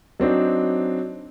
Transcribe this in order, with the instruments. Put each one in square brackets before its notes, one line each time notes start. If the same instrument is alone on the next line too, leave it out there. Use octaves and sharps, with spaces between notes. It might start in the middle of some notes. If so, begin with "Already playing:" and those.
[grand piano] F#3 C4 D4 D#4